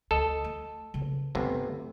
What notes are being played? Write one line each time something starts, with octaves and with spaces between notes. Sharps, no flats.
D2 A4 D#5
A3
C#3 E3
G1 C3 A3